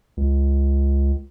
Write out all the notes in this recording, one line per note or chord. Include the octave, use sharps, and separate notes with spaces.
C#2